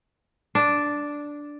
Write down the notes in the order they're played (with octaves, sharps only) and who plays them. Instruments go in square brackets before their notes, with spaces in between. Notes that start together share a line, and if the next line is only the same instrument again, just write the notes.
[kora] D4